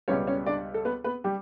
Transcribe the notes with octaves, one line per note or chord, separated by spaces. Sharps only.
C#2 B2 G3 B3 C#4 C#5
C#4 C#5
D4 D5
A4
B3 B4
B3 B4
G3 G4